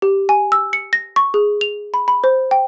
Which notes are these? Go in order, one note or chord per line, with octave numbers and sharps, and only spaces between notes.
G4
G#5
E6
C#7
A#6
C#6
G#4
F7
B5
B5
C5
G5